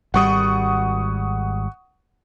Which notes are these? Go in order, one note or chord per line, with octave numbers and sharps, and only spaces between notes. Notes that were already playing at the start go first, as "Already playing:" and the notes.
G#1 G3 F#5 C#6 D#6